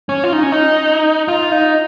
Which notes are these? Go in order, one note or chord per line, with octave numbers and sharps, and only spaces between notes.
C#4
F4
D#4
C#4
D#4
F4
D#4